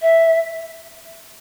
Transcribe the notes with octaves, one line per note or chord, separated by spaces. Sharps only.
E5